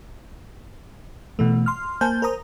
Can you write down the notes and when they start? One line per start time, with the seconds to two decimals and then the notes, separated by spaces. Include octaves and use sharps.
1.39 B2 E3 A3
1.66 C6 F6
2.01 A#3 C5 G#5 A5 G6
2.22 A#4 C5 A#5 D#6